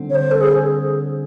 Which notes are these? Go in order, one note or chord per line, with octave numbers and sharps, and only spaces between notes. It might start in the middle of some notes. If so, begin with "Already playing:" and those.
Already playing: D3 G3 C4
C#5
C5
A4
G#4